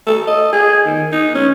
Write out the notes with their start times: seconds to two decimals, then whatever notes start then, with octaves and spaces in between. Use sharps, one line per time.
0.07 A4
0.27 D#5
0.53 G#4
0.86 D#3
1.12 D#4
1.35 C#4